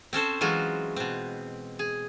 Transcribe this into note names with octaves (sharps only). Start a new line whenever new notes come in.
C4 C#4 A4 C5
E3 F#3 G#3 F4 F#4
B2 C4
G#4